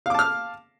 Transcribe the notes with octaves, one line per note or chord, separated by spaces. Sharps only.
F5 A5 D6 F6